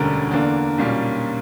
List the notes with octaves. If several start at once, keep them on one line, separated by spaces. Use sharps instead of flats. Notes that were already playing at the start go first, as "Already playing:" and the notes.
Already playing: E1 D2 D3 G3 C#4 A#4
E2 D3 A#3 D4
B1 A#2 G3 A#3 C#4